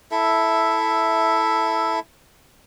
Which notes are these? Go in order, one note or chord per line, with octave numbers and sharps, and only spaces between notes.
E4 A4 E5